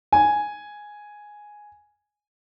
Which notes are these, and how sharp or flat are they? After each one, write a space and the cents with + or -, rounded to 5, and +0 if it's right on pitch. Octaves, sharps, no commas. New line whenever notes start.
G#5 +0